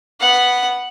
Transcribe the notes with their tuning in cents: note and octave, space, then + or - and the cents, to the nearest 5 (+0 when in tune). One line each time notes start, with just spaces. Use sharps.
B3 +0 F#5 +0